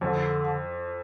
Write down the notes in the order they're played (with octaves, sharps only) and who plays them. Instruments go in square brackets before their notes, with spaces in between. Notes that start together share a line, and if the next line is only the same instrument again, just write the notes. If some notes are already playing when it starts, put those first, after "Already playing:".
[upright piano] F2 [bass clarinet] D3